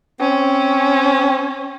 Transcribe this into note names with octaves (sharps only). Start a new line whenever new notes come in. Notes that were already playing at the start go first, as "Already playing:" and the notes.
C4 C#4